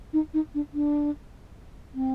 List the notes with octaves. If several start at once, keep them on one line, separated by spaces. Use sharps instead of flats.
D#4
D#4
D4
D4
C4